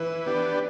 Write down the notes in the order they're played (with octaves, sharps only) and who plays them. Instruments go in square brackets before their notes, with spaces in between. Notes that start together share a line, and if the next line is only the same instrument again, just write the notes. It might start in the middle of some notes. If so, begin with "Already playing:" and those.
Already playing: [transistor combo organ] E3 [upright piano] B4
[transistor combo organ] B3 D4 G4